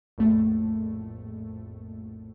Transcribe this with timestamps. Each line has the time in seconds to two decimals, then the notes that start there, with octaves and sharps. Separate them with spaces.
0.18 A#1 F2 A2 A3